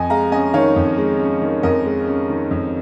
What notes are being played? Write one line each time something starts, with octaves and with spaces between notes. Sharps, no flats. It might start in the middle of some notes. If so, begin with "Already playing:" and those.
Already playing: F2 D#5 G#5
G#3 F5 A#5
C#4 D#5 G#5
D#3 C#5 F5
F2
G#3
C#4
D#3
F2 A#4 D#5
G#3
C#4
D#3
F2